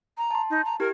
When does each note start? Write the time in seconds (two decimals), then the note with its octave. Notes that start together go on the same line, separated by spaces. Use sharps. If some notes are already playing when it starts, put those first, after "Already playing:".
0.18 A#5
0.31 A5 C6
0.50 D#4
0.65 A#5
0.80 E4 G4 A#4